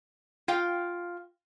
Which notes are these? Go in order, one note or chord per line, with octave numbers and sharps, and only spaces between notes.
F4 F5 G5